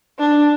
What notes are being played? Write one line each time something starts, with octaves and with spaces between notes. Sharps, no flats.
D4